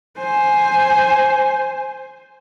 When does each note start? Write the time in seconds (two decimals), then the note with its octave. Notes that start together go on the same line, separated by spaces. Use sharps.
0.18 C5 G#5